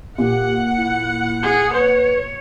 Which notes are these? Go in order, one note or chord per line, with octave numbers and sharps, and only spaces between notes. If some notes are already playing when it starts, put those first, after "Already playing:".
A#2 G4 F#5
E4
G#4
B4 C#5